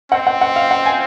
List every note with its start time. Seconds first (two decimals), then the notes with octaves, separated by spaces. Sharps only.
0.12 C4 F#5
0.27 F#5
0.41 F#5
0.56 F5
0.71 F#5
0.86 G#5